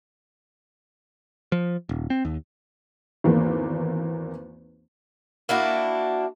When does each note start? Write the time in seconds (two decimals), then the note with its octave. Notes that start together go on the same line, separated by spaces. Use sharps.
1.52 F3
1.89 D#1
2.10 C4
2.25 D#2
3.24 G#1 E2 A#3
5.49 A#3 D4 E4 F#4